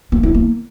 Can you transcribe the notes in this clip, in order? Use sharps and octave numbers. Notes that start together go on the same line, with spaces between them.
A#3
E4
A#3